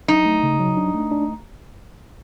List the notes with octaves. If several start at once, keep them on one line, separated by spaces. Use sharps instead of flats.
F#3 D#4
A3
C#3
F#3
D4
A3
D4